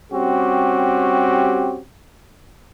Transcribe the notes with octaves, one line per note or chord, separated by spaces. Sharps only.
G3 C4 C#4 F#4 G4